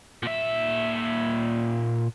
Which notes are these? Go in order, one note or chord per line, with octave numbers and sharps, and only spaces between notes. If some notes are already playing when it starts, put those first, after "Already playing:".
A#2 E5